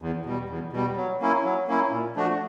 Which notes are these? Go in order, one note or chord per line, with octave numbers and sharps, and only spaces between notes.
E2
B2 G3
E2
B2 G3
F#3
A#3 C#4 E4
F#3
A#3 C#4 E4
A#2
F3 A3 D4 F#4